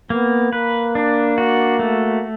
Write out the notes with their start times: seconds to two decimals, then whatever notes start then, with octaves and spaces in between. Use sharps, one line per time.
0.10 A#3 B3
0.52 A#3 B4
0.95 D4
1.38 F#4
1.79 A3